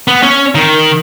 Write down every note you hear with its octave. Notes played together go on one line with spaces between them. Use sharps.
B3
C#4
D#3